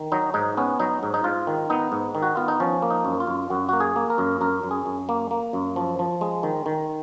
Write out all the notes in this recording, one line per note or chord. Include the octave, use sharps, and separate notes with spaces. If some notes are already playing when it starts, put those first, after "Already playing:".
Already playing: D#3
F#3 D#4
G#2 D#4
B3 C#4
F#3 D#4
G#2
D#4
G#2 F4
D#3
B3 D#4
G#2
D#3
F#4
B3 F4
D#4
F3 C#4
A#3
D#4
F#2
F4
F#2
F#2 F#4
A#3 F#4
G#4
A#3
A#4
F#2
F#2 A#4
F#2
G#4
F#2
A#3
A#3
F#2
F3
F3
G#3
D#3
D#3